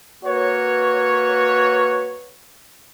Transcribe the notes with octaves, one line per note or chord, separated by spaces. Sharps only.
A#3 F#4 B4 C#5